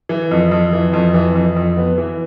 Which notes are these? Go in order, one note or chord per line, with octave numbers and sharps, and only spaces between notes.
E3
F2
F2
E3
F2
E3
F2
F2
B3
E3